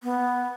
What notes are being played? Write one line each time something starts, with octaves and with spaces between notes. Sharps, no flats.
B3